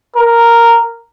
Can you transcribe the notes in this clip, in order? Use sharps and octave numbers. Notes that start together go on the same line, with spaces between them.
A#4